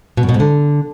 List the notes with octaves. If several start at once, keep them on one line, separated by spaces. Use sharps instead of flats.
B2
F#2
B2
G#2
D3